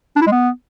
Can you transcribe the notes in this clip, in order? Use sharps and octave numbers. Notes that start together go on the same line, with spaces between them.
D4
E4
G#3
B3